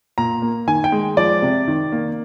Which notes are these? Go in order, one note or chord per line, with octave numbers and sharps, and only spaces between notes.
A#2 A#5
A#3
D#3 G#5
G5
G#3
F3 D5
C3
D#3
A#3